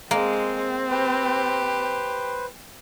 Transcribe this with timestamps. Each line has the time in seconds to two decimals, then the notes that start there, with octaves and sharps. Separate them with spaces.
0.11 G#3 A#3 C4
0.90 G4 B4 C5